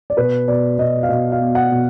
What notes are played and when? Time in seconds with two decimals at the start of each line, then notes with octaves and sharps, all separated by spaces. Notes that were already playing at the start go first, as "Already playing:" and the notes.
0.10 D5
0.17 B2 B4
0.47 B2 D5
0.78 B2 D#5
1.03 F5
1.09 B2 D#5
1.32 F5
1.40 B3
1.55 F#5
1.71 B2